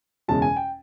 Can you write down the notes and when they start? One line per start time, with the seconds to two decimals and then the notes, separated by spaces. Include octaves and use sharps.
0.28 F#1 E2 B2 G#3 C#4 A5
0.42 G#5
0.56 G5